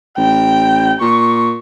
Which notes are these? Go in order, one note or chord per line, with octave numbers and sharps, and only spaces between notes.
A1 G5
A#2 C#6